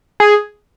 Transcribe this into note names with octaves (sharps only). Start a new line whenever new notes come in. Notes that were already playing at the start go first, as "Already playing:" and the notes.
G#4